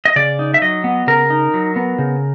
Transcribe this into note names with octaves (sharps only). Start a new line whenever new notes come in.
D#5
C#3 D5
D#4
E5
F#3 D#5
B3
C#3 A#4
D#4
F#3
B3
C#3